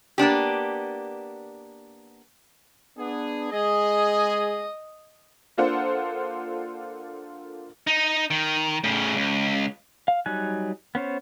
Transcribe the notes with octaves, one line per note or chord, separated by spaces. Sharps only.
A#3 B3 D4 G4
B3 D4 G#4
G#3 G#4 D#5
A#3 D4 F4 A4 C5 F#5
D#4
D#3
A2 C#3
C#2
F5
F#3 G3 D#4 G#5 F#6
B3 C#4 C5 C#5